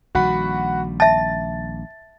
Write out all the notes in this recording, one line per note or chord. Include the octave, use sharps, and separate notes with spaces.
A#1 D#3 G3 F#4 F#5 B5
E5 A5 A6